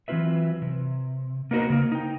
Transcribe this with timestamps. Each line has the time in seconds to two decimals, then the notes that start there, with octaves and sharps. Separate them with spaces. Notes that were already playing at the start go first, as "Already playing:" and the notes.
0.08 E3 F#3 C4 F4 B4 E5
0.62 C3
1.51 A#3 B3 D#4 F#4 A#4 C5
1.70 C#3 A#3
1.92 D#4 G5